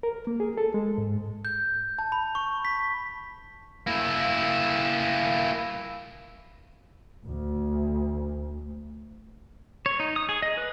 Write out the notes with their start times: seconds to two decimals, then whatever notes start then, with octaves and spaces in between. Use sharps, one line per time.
0.03 A#4
0.27 A#3
0.40 G#4
0.58 A4
0.74 G#3
0.98 G#2
1.45 G6
1.99 A5
2.12 B5
2.35 C#6
2.65 B6
3.87 A#3 E4
7.24 D2
9.86 C#5
10.00 D#4
10.16 D#6
10.29 G#4
10.42 D#5
10.57 B4